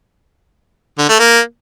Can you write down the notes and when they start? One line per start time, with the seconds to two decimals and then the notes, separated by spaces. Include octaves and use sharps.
0.98 D3
1.09 A3
1.19 A#3